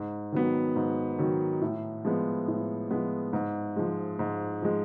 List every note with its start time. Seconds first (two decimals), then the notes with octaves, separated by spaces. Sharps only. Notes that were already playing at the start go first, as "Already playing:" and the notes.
Already playing: G#2
0.32 D#3 F#3 B3
0.76 G#2
1.19 D#3 F#3 B3
1.61 A2
2.05 F3 G#3 B3
2.48 A2
2.91 F3 G#3 B3
3.33 G#2
3.76 F3 G#3
4.19 G#2
4.62 F3 G#3